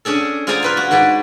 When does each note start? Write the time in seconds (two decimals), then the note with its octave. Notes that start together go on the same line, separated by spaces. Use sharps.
0.05 C#4 D4 G#4 A4
0.47 F4 G#4 C5 D5 G#5 A#5
0.63 F4 B4 G#5
0.77 F#4
0.91 G#2 G#3 B4 D5